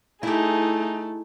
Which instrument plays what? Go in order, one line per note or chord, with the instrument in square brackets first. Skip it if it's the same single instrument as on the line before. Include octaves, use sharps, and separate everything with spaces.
[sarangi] A3 [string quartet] D#4 G#4 [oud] E4 G4